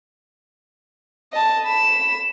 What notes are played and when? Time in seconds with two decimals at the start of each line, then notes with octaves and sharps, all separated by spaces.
1.33 D#5 A5
1.66 B5 E7